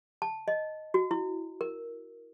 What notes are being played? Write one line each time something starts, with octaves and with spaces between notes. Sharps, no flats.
A5
D#5
F#4
E4
A#4